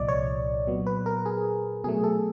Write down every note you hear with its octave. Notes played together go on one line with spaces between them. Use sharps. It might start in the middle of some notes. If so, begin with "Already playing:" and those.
Already playing: C2 A#2 F3 D5 D#5
C#5
A#2 F#3 B3
B4
A#4
G#4
B2 F#3 A3 G#4
A4